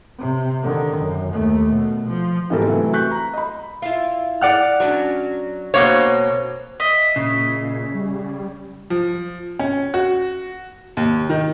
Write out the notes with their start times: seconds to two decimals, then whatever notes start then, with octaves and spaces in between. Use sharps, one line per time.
0.19 C3
0.63 D3 D#3
0.98 F#2
1.32 D#2 A3
1.70 B2
2.08 F3
2.50 G#2 B2 E3 G4 A4 A#4
2.67 C3 E3 F#3 A3
2.93 C#6 F#6 G6 B6
3.11 A#5
3.34 D#5 B5
3.82 E4 F4
4.41 D5 F#5 F6
4.80 F#3 C#4 D4
5.74 B2 A#3 C4 C#5
6.80 D#5 E5
7.16 A#2 C#3
7.94 G3
8.90 F3
9.59 C#4
9.94 F#4
10.97 D#2
11.30 D#3